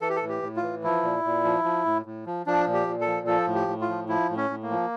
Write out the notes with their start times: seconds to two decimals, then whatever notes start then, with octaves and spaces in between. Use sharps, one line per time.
0.01 E3 A4
0.10 G4
0.16 A4
0.22 A2
0.29 G4
0.42 A2
0.56 F4
0.63 E3
0.84 F3 E4
1.03 A#2
1.24 A#2
1.44 F3
1.64 F3
1.85 A2
2.06 A2
2.26 F3
2.46 F3 D4
2.67 A#2
2.73 G4
2.87 A#2
3.01 A4
3.07 F3
3.27 F3 A4
3.47 A2
3.55 G4
3.68 A2
3.81 F4
3.89 F3
4.08 F3 E4
4.30 A2
4.37 C#4
4.50 A2
4.63 A#3
4.70 F3